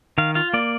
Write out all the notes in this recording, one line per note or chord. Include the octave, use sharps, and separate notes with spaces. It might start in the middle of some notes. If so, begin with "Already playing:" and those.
D#3 F5
F4 F5
A#3 D5